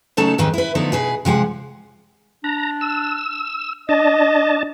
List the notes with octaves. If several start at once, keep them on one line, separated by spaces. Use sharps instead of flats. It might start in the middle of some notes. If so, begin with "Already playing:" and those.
C#3 F#3 A3 D#4 A4 A5
D#2 G#2 D#3 C4 B4
E4 B4
D3 F3 A3 B3 D#4
B2 G#4 B4
C3 F3 G#3 F#5
D4 A#5
E6
D4 D#5 A5